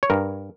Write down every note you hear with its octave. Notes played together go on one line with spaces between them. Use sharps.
C#5
G2 A#4